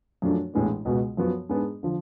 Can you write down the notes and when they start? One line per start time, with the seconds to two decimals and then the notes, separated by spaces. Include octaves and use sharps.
0.22 F#2 F3 A3 D4 F#4
0.54 A1 A2 G#3 B3 D4
0.85 C#2 B2 G#3 B3 F#4
1.17 F#2 F3 B3 F#4
1.49 G#2 G#3 B3 D4 G#4
1.83 D3 F3